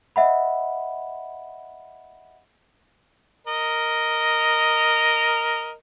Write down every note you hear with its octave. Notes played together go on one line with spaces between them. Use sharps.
D#5 E5 F#5 B5
A#4 D#5